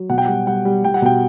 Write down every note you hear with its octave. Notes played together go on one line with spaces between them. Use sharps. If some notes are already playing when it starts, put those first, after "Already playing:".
Already playing: F#3
B2 F#5
G5
G3 F#5
G3 F#5
G3
G3 G5
F#5
B2 G5